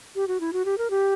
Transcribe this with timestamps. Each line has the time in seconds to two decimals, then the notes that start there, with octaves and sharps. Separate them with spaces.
0.15 G4
0.28 F#4
0.40 E4
0.53 F#4
0.65 G4
0.78 A#4
0.90 G4